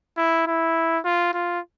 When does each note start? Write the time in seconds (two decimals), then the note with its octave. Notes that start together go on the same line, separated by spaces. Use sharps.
0.18 E4
0.47 E4
1.05 F4
1.34 F4